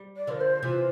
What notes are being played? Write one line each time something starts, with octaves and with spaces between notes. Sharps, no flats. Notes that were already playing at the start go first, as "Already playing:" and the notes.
Already playing: G3
D5
D3 F3 A#4
C5
C3 E3 F4